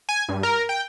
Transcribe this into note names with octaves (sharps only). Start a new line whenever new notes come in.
G#5
G2
A#4
G5